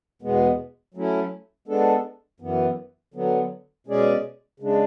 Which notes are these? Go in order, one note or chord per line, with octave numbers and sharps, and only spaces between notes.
E2 B2 G#3 B3
F#3 A3 C#4 E4
G#3 B3 D4 A4
F#2 E3 B3
D3 F#3 B3
B2 G#3 C#4 G#4 D5
C#3 G#3 D4